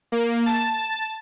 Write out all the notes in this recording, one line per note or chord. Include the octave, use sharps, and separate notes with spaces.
A#3
A5